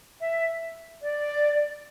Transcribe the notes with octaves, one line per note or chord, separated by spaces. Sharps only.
E5
D5